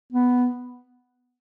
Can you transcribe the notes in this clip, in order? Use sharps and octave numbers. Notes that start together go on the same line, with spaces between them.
B3